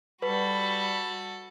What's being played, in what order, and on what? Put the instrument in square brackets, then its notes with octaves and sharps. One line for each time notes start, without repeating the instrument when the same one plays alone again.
[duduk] G3 [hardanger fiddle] F#4 A4 [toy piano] B4 [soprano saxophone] B5